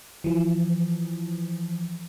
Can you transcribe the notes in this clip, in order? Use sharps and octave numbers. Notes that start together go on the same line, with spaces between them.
E3 F3